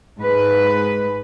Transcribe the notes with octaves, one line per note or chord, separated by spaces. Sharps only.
G#2 B4